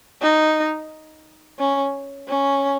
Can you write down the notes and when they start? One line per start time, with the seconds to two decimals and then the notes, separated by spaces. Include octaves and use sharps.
0.22 D#4
1.59 C#4
2.28 C#4